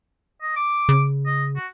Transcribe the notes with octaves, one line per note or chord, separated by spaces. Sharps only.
D#5
D6
C#3
D#5
F#4